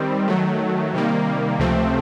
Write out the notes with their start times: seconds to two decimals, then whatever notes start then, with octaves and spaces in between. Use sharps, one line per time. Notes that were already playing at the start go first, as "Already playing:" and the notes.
Already playing: D#3 G3 C4
0.28 D#3 F#3 A3
0.93 C3 D#3 G3 A#3
1.59 C#2 C3 F3 A3 C4